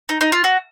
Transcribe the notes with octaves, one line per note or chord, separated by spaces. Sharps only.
D#4
D#4
F4
F#4